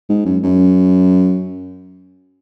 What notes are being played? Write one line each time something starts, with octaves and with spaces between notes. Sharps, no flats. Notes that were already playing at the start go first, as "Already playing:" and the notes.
G#2
F#2
F#2